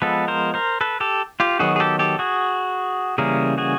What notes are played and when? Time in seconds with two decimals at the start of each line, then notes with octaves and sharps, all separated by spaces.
0.02 F3 G#3 B3 A4 B4
0.28 A#4 C5
0.54 A#4 C5
0.81 A4 B4
1.00 G4 A4
1.40 F4 G4
1.59 D#3 F#3 B3 F#4 G#4
1.76 G#4
1.80 G4 A4
1.99 G4 A4
2.19 F#4 G#4
3.18 C#3 E3 G3 A#3 C#4 G#4 A#4
3.58 F#4 G#4